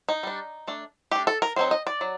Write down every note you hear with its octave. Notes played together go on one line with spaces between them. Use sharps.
D#4
G3 D4
A3 D4
A3 D4 G4
A4
A#4
F#3 C4 D#4 C5
D#5
D5
F#3